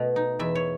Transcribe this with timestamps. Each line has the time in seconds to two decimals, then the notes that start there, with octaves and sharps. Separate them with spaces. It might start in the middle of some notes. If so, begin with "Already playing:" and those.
Already playing: B2 A3 D#5
0.16 D#4
0.39 E2 E5
0.55 C#5